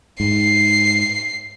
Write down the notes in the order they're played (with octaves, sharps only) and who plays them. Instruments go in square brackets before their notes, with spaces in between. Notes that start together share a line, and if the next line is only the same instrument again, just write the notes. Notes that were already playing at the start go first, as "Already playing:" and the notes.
[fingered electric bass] G#2 [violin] C7